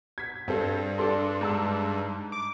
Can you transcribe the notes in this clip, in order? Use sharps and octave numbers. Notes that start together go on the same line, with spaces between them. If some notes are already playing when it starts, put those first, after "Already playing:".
G#6 B6
G2 C4 A4
D4 A4 C6
G#2 A5 E6
D6